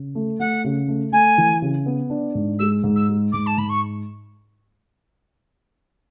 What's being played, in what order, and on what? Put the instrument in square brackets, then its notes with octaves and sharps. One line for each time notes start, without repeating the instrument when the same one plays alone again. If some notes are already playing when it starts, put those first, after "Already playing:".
Already playing: [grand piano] C#3
A3
[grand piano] A3 [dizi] F#5
[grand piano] C#3
A3
[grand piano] A3 [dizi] G#5
[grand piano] E3
C#3
B3
D4
G#2
[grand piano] G#3 [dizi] E6
[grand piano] G#2
[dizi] E6
[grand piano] G#3
[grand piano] G#2 [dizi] D6
[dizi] A5
[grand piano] G#2 [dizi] B5
[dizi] C#6